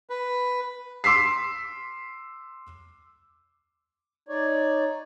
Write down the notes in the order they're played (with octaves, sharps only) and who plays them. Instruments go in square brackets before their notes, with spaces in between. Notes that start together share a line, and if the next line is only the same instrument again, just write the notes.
[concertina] B4
[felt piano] C6 D6 E6 B6 C7
[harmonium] D#4 C#5 D5